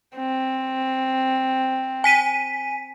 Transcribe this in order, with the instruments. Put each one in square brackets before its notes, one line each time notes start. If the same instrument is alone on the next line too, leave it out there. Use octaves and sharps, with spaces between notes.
[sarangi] C4
[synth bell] G#5 B6 D#7